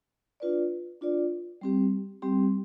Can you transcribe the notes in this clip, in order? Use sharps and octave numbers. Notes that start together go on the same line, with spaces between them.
D4 F4 B4 D5
D4 F4 B4 D5
G3 C4 G4
G3 C4 G4